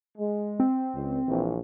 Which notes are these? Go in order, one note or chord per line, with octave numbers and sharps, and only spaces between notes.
G#3
C4
C#2
A#1 E3